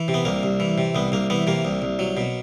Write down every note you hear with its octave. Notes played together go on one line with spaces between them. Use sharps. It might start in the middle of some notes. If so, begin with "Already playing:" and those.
Already playing: E3
C3
B3
C2 A#3
C2
E3
C3
C2 B3
C2 A#3
E3 B3
C3 A#3
C2
C2
F#3
B2